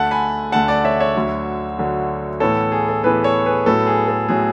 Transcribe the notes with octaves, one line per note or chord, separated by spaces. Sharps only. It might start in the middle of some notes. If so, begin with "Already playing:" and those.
Already playing: D2 D3 A3 F#5 A5
G#5 B5
D2 D3 A3 F#5 A5
D5 F#5
C#5 E5
C#5 E5
D2 D3 F#3
D2 D3 F#3
A2 E3 B3 A4 C#5
G#4
A4
A2 E3 B3 G#4 B4
A4 C#5
G#4 B4
A2 F#3 B3 A4
G#4
A4
A2 F#3 B3 G#4